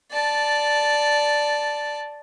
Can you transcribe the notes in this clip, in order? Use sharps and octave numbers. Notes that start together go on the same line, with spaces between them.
D5 A5